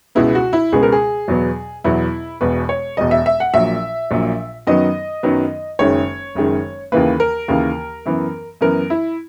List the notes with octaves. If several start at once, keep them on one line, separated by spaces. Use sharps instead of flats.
C#2 B2 G#3 B3 E4
F#4
E4
C#2 B2 G#3 B3 G#4
A#4
G#4
E2 B2 F#3 B3
E2 B2 F#3 B3 E4
E1 E2 B2 B4
C#5
E1 E2 B2 D#5
E5
E5
F#5
A#1 A#2 F#3 E5
A#1 A#2 F#3
F#2 D#3 F#3 B3 D#5
F#2 D#3 F#3 B3
F#1 F#2 D#3 G#3 C#5
F#1 F#2 D#3 G#3
D#2 C#3 E3 A#3 B4
A#4
D#2 C#3 E3 A#3
F#2 E3 B3
F#2 E3 B3 A#4
E4